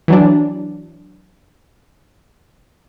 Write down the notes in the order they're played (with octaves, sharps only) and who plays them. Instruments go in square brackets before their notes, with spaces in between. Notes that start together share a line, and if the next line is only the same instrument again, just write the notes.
[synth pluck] E3 F#3 D4